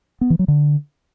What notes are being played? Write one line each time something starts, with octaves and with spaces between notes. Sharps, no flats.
B3
E3
F#3
D3